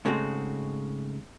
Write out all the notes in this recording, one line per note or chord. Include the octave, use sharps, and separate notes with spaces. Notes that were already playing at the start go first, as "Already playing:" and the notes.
G#2 C#3 G#3 A3 C4 F#4